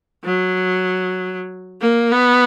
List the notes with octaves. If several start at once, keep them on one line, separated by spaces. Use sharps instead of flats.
F#3
A#3
B3